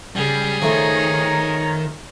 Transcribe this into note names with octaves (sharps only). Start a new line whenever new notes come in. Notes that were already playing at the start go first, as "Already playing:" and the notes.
C#3 G3 G#4
D#3 F3 A3 D#4 C#5